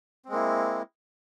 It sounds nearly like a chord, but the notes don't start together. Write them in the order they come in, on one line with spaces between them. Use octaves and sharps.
C4 G#3 A#3 E4